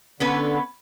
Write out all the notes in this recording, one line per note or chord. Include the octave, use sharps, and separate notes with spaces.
D3 B3 C#4 B4